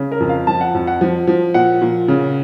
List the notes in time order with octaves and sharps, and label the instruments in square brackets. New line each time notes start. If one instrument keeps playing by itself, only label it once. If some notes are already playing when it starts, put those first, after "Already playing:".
Already playing: [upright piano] C#3
A#4
F2
F5
F3 A5
F#5
F2
F#5
F3
F3
A#2 F#5
A#2
C#3